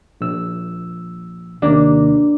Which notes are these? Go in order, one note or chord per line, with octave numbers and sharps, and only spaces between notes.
A#1 E6
D#2 C3 A#3 D4